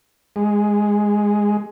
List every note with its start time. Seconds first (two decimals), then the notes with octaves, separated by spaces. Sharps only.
0.36 G#3